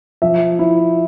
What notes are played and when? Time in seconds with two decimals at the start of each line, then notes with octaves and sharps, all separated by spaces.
0.22 F3 E5
0.59 E4